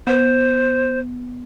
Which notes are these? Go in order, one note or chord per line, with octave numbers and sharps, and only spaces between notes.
B3 C5